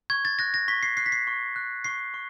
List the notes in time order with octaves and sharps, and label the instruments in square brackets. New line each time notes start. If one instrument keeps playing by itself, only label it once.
[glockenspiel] C#6 G#6
A6
F#6 A#6
A#6
C#6 B6
C7
F#6 C7
B6
C7
C#6
F#6
C#6 C7
C#6